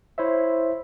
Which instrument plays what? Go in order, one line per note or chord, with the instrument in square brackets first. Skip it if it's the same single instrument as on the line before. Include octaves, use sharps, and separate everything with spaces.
[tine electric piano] E4 C5 C#5 E5